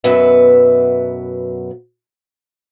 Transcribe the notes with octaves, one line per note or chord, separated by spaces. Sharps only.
F#2 B2 F#3 B3 B4 E5